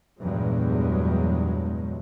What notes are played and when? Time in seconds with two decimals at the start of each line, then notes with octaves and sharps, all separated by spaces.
0.19 E2 G2 A#2 F#3 G#3